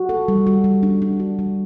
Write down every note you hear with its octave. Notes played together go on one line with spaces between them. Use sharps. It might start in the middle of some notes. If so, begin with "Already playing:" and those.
Already playing: F#4
A4
G3
F#4
G3
D4
D4
F#4
G3